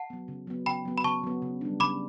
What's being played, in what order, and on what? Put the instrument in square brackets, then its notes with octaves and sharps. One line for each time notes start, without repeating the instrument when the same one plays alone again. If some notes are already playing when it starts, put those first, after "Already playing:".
Already playing: [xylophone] F#5 A5
[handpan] F#3 B3
C#3
F#3 B3
[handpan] C#3 [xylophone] G5 B5
[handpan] F#3 B3
[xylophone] B5
[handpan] C#3 [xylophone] A5 C#6
[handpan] F#3 B3
C#3
G3 D4
[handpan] C#3 [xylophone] B5 D6